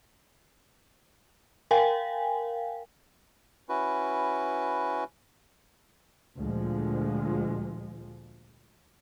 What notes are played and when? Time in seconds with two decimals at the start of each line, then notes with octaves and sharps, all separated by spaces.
1.71 A#4 F5 G5 G#5
3.69 C#4 E4 F#4 B4
6.38 D2 A#2 F3 G#3